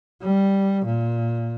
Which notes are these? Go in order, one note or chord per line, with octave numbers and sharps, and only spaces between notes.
G3
A#2